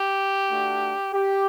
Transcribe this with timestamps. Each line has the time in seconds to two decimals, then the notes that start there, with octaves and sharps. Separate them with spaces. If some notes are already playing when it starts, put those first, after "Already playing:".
Already playing: G4
0.49 A3 D4 F#4
1.13 G4